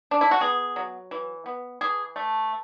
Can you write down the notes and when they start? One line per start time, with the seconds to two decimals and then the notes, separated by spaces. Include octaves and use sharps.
0.11 D4
0.21 E4
0.31 F#4
0.41 B3 G#4
0.76 F#3
1.11 E3
1.46 B3
1.81 E3 G#4
2.16 A3